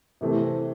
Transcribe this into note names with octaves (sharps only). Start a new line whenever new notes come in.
C3 E3 A3 C4